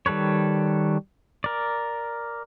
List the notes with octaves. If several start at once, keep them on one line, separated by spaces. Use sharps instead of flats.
D#3 G3 A4 B4 C#5
A#4 D5